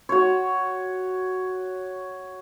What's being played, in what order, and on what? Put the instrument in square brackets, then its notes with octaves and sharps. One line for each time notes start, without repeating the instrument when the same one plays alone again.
[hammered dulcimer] F#4 C#5